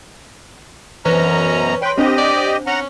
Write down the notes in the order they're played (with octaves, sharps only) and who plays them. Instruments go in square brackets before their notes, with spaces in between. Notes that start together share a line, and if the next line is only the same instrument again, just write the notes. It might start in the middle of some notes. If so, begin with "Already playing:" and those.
[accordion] F#2 B2 A#5 [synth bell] E3 B4 C5 [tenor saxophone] C#4
[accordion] B4 G5 [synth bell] C#5 C6
[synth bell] C4 D4 C5 [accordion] G4 D#5
[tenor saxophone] D5
[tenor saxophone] C#4 [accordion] F#5 A#5